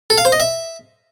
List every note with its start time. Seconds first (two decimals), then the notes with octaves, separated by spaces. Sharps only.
0.10 A4
0.18 F5
0.25 C5
0.32 D#5
0.40 E5